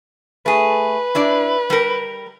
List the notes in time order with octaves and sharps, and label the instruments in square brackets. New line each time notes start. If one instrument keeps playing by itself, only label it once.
[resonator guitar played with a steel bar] A3 G#4 [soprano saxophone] B4
[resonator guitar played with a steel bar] D4 E4 D5
G3 A#4